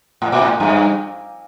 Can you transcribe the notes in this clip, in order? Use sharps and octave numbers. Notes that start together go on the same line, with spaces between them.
A2
A#2
A2
G2